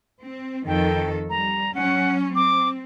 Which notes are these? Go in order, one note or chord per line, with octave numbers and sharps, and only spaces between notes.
C4
F2 D#3 A4 G5
G3 A#5
F#3 C#4 F#5
C4 D6